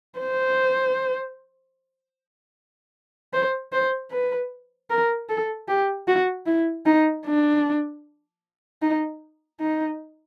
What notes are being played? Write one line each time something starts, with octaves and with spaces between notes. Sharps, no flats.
C5
C5
C5
B4
A#4
A4
G4
F#4
E4
D#4
D4
D#4
D#4